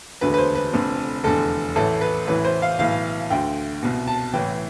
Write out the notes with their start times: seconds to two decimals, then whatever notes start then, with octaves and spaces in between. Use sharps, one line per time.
0.21 E1 D2 D3 B4
0.34 B4
0.38 C5
0.55 B4
0.73 F1 F2 D3
1.24 F1 E2 D3 A4
1.76 A1 A2 E3 A4
2.01 B4
2.27 A1 A2 E3 B4
2.44 C5
2.62 F5
2.79 B1 A2 E3 F5
3.30 D2 D3 G5
3.83 C2 B2
4.07 A5
4.33 A1 A2 E3 G5